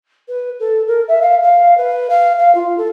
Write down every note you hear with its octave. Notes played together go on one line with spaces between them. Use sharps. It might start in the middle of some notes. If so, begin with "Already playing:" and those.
B4
A4
A#4
E5
F5
F5
B4
F5
F5
F4
A4